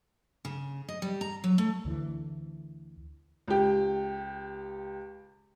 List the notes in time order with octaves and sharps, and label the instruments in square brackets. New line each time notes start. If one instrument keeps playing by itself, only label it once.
[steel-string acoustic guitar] C#3
D#5
G3
A#5
F#3
A3
[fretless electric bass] D2 D3 E3
[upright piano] C#2 G4